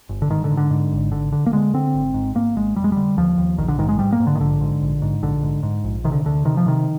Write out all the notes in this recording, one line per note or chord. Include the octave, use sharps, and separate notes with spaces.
G1
D3
G#2 D#3
D3
G#2
D3
G#2
G#1
D3
D3
A#3
D3 G#3
D3 C4
G#1
G#2
G#2 A#3
G#1 G#3
F1 G3
G#3
D3 G3
D#2 F3
D#2
A#1 D#3
D3
G#2 D#3
G#3
G#2 G3
A#3
G#2
D3
D#3
A#1 D3
G#2
A#1
G#2
A#1 D3
G#2
G#2
A#1
C3 D#3
D3
D2 D3
C3 D#3
F3
C3 D#3